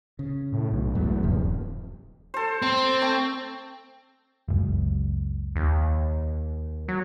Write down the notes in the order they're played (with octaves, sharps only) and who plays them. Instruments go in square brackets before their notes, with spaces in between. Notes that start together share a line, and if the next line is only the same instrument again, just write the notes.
[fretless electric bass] C#3
[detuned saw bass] A2
B1
[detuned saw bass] E2 [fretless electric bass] G#2 F#3 A3
[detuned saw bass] D#1 [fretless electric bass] G2 C3 F3
[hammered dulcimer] A4 C5
[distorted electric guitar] C4 [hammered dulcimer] C6
[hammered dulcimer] A3 G5
[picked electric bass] F#1 C#2
[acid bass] D#2
F#3